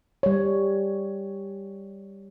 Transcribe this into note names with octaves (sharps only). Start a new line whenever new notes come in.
G3 C#5